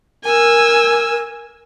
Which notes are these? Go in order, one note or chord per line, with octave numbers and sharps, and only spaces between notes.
A#4 G#5 E6